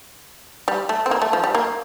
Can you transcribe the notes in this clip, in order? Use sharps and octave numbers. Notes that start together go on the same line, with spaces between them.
G3
A3
C4
A#3
A3
F3
G3
A#3